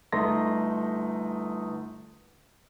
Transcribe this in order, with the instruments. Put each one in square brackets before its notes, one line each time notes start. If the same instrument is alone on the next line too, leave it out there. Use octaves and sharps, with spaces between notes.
[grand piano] G1 A3 D#4 C6 A#6